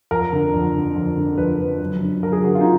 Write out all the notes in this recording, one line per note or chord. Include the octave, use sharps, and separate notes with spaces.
F2 A#4
D3
F2
D3
F2
D3
F2 B4
D3
F#2
D3
F#2 A#4
G#4
D3 F#4
F4
D#4